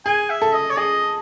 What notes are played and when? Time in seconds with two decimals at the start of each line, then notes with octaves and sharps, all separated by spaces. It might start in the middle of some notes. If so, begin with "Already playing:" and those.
0.06 G#4 G#5
0.30 E5
0.42 A4
0.54 D#5
0.70 C#5
0.77 G#4 D#5